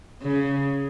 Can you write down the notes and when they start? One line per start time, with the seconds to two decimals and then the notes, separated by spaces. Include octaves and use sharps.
0.22 C#3